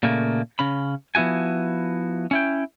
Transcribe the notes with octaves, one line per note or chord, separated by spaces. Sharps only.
A#2 C#3 A3 A#3
C#3 C#4 B5
F3 B3 E4 F#4 G#5
C#4 E4 G5